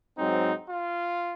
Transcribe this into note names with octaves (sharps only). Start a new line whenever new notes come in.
G#2 F#3 C4 D#4
F4